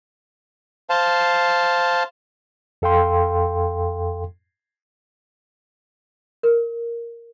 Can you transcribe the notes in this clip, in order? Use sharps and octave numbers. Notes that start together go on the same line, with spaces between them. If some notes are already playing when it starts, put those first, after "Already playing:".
C5 F5 A5
F2 A4 F5 G5 C6
A#4